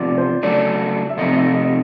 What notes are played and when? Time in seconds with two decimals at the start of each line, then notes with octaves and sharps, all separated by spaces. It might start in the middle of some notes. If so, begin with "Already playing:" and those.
Already playing: E2 C3 F3 D5
0.18 C5
0.43 C#3 F#3 A3 D4 D5
1.09 E5
1.17 C3 F3 A3 C4 D#4 D#5
1.36 E5
1.54 D#5